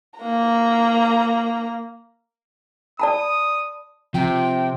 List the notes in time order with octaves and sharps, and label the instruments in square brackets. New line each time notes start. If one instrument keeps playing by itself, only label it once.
[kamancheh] A#3 A#5
[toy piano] D5 A5 B5 [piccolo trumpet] D#6
[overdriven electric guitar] C3 [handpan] F3 [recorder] G5